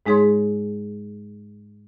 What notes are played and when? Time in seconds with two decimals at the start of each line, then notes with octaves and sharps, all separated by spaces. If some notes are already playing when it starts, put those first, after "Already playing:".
0.06 G#2 G#3 D#4 G#4 C#5 C6